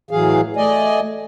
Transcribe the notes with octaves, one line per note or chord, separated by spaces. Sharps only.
A2 E3 F#3 G#4 F5
A3 D5 D#5 G#5